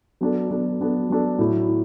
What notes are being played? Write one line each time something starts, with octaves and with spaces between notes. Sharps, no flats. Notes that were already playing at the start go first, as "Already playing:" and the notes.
F#3 B3 D4 A4
F#3 B3 D4 A4
F#3 B3 D4 A4
F#3 B3 D4 A4
A2 F#3 A3 E4
E4